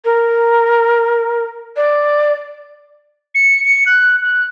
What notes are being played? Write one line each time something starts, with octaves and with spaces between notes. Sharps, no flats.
A#4
D5
C#7
C#7
F#6
F#6